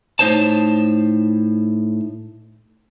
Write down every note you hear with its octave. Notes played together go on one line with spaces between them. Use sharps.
A2 D#4 C5 C#5 A5